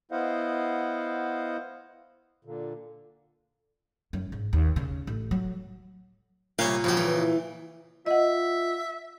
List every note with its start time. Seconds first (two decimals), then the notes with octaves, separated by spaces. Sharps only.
0.11 B3 E4 C5 D#5 F5 F#5
2.45 A#2 D3
4.13 F#2
4.32 G#2
4.53 D#2
4.76 C#3
5.07 A1
5.31 F#3
6.59 C2 A#2 C#5 F5
6.84 F2 C#3 F3 F#4 G4
6.97 E3
8.06 F4 D#5 E5 F#5